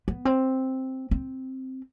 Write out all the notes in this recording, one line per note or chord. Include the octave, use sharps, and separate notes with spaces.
B3
C4
C4